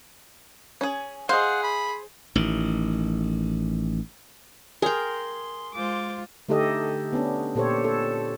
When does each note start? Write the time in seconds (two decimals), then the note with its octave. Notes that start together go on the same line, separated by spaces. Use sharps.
0.81 C#4 G#4
1.29 G#4 C5 D#5 F5 F#5 C6
1.63 B5
2.35 A1 D#3
4.82 G#4 A#4 G5 C6
5.74 G#3 F4 C5 D6
6.49 D3 A3 D#4 G4 A4 D#5
7.13 B3 C#4 D4
7.55 A#2 G4 A4 C5 C#5
7.85 A4